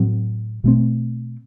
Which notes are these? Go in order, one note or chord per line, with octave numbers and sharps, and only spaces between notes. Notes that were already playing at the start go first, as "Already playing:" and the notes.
Already playing: A2 F#3 C4
B2 A3 C4